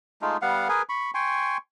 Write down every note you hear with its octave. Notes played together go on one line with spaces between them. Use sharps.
G#3 A3 D#4 F4
G3 B3 F5 F#5
G#4 A#4 B4 G#5
B5 C#6
G5 G#5 C6 C#6